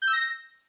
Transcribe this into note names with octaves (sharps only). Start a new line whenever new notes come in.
G6
E6
A#6